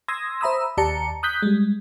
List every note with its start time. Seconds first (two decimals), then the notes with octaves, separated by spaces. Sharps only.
0.08 C6 D#6 E6 G#6 A#6
0.41 C5 E5 A#5 B5 D#6 E6
0.77 D#2 G4 D5 A5 A#5 C#7
1.23 D#6 F#6 G6 B6
1.42 G3 G#3